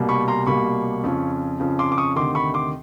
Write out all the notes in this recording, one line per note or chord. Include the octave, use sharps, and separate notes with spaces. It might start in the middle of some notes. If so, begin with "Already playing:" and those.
Already playing: C2 B2 G3 A#3
B5 C#6
A#5 C6
C2 B2 G3 A#3 B5 C#6
F2 C#3 F3
F2 C#3 F3
C6 D6
D6
C#6 D#6
D2 C3 D#3 C6 D6
B5 C#6
C6 D6